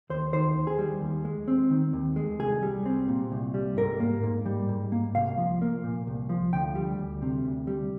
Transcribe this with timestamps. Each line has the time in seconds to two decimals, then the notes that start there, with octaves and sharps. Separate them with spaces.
0.10 D#2 C5
0.33 D#3 C5
0.56 D#2
0.67 G#4
0.79 G3
1.01 D#2
1.25 G#3
1.48 C4
1.70 D#3
1.93 D#2
2.16 G#3
2.39 C2 G#4
2.63 G3
2.86 C4
3.08 A#2
3.32 C2
3.54 G3
3.77 G#2 A#4
4.00 A#3
4.23 G#2
4.46 G3
4.69 G#2
4.92 A#3
5.15 C2 F5
5.38 F3
5.62 A#3
5.84 A#2
6.07 C2
6.29 F3
6.53 D2 G5
6.75 G3
6.99 D2
7.22 C3
7.45 D2
7.67 G3